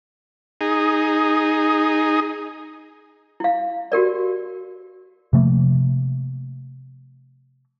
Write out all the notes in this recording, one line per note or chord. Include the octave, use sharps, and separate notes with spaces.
D#4 G#4
E4 F5
F#4 G4 A#4 D5
C3 F3 A3 A#3